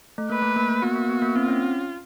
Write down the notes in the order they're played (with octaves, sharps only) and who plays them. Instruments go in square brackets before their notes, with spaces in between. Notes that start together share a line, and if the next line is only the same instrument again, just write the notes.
[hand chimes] A3
[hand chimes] A#3 [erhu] B4
[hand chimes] A3
A#3
A#3
[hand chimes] B3 [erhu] F#4
[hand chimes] A#3
B3
A#3
[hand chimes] C4 [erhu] F4
[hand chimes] C#4